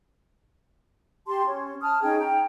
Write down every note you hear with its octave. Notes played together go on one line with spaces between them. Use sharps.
G4 A5 C6
C#4
A5 D#6 F6
C#4 D#4 G#4 G5
G5 A#5